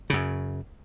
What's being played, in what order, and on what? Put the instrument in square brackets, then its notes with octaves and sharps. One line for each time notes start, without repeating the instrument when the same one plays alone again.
[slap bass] F#2 C#3